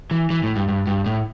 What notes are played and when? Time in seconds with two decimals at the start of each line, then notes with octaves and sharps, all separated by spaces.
0.11 E3
0.30 E3
0.43 A2
0.56 G2
0.68 G2
0.87 G2
1.06 A2